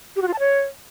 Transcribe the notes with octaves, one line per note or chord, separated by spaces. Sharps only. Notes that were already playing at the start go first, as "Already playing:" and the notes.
G4
F#4
F4
A5
C#5